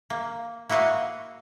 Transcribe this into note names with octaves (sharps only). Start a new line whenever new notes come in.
A#3
A#3 E4 F#4 D#5 F5